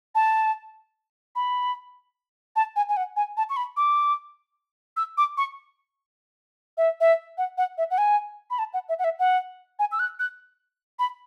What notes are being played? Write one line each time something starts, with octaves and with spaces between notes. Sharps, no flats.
A5
B5
A5
G#5
G#5
F#5
G#5
A5
C#6
B5
D6
E6
D6
C#6
E5
E5
F#5
F#5
E5
F#5
G#5
B5
A5
F#5
E5
F#5
E5
F#5
G#5
E6
F#6
F#6
B5